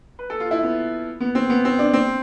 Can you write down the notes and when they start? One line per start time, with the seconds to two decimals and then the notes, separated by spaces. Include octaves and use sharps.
0.19 B4
0.30 A4
0.40 F4
0.51 E4
0.63 B3
1.20 B3
1.35 C4
1.50 B3
1.65 C4
1.79 D4
1.93 C4